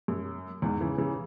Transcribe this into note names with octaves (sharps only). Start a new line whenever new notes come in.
F#2
E2 G#2
C#3 E3
C#3 E3